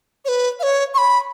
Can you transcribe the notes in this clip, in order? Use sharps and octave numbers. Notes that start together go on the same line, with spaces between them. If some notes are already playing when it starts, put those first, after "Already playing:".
C#5
B4
F5
C#5
C#6
B5